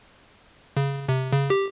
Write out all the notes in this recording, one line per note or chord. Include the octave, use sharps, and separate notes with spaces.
C#3
C3
C#3
G4